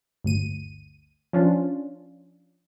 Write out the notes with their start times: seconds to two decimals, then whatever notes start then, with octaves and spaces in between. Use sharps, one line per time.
0.24 G1 D2 D#7
1.33 F3 C#4 D4 F4